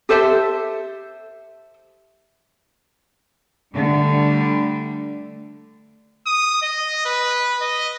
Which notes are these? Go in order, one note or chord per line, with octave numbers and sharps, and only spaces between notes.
G4 A4 C5 E5
D3 G3 A3
D#6
D#5
B4
D#5